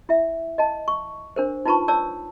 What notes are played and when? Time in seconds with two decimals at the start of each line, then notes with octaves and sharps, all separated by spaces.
0.09 E4 E5
0.58 D#5 A5
0.88 C#6
1.36 D4 A#4 C5
1.65 D#4 F4 B4 A5 B5 C#6
1.88 C#5 D5 A5 E6